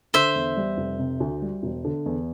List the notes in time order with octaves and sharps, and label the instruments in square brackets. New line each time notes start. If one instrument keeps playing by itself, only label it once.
[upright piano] D3 [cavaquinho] C5 E5
[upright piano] E2
G3
F1
C3
D2
G3
E1
D3
E2